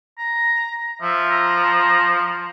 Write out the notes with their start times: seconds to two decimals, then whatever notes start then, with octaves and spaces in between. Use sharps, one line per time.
0.18 A#5
1.02 F3 E5
1.30 A#5